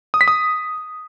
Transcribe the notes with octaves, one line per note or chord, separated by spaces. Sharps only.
D#6
B6
D#6